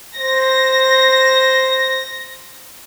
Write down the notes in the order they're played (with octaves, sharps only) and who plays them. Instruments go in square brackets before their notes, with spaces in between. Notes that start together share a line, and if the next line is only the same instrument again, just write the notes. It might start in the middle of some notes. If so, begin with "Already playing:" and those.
[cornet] C5 [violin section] A#6